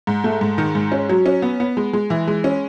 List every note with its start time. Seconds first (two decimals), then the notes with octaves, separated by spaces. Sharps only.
0.07 G#2
0.24 A3
0.41 G#2
0.58 D#3
0.75 G#2
0.92 C#4
1.09 F#3
1.26 C#4
1.42 B3
1.60 B3
1.77 G#3
1.93 G#3
2.10 E3
2.28 G#3
2.44 C#4